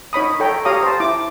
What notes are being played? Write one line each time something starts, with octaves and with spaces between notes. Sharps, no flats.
D#4 C#5 B5 D#6
A4 C#5 G5 A#5
G4 C#5 F5 A#5 D#6
C5 A5
E4 D6